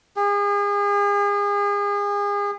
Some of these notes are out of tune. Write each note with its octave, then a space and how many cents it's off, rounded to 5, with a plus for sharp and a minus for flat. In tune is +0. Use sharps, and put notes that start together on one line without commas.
G#4 -35